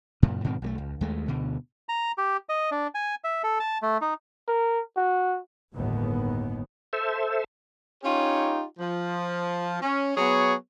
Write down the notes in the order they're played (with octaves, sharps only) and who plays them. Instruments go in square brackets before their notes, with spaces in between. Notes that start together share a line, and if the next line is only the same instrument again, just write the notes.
[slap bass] F#2 A#2 C#3
G#2 B2 D#3 C4
B1 G3 A3
C#2
D#2 G#3 A3
D2 B2 D3
[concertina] A#5
G4
D#5
D4
G#5
E5
A4
A5
A3
D#4
[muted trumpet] A#4
F#4
[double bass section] G1 D#2 A2 D#3 B3
[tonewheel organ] A4 C5 E5
[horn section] C#4 D#4 F4 G4 C#5
F3
C#4
F#3 B3 G#4 C#5